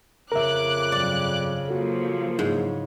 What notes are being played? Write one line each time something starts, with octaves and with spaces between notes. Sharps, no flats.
F2 C#3 A#4 E5 D6 F#6
G2 F#3 D5
F3 F#3 A#3 F#4 A4
G#2 C#3 E4